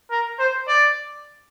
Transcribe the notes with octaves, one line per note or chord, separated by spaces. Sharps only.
A#4
C5
D5